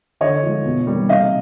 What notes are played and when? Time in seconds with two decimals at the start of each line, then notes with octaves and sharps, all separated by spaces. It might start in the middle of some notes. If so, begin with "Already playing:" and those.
0.21 D3 C#5 D#5
0.43 F3 G#3
0.65 B2
0.87 G3 A#3
1.09 C3 D#5 F5